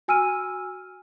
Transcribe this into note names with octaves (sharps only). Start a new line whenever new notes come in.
F#4 G#5 E6 F6 D#7